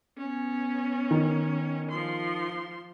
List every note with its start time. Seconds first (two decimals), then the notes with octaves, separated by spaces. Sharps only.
0.18 B3 C#4
1.11 D#3
1.91 F3 C6